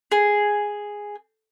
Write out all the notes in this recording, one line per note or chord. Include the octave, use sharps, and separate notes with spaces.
G#4